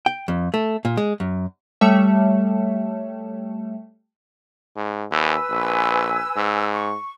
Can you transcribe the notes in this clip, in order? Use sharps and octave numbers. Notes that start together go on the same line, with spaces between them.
G5
F2
A3
A#2
G#3
F#2
G3 A3 C#5 E5
G#2
D#2 B4 G#5 E6
A#1
G#2
C#6